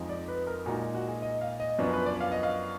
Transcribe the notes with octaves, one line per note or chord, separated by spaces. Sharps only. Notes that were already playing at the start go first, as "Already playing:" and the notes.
Already playing: F2 F3 G#3 D#4
D5
B4
A#4
A#2 G#3 D#4 F#4
F#4
G#4
D#5
F5
D#5
F#2 F3 B3 D4
B4
D5
F5
D#5
F5